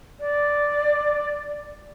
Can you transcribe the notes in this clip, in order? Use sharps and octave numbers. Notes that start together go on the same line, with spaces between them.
D5